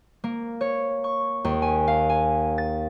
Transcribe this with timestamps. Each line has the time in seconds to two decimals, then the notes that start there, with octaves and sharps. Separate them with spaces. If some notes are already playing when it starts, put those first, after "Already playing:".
0.24 A#3
0.61 C#5
1.04 C#6
1.44 D#2
1.62 G#5
1.88 F5
2.09 G#5
2.58 A6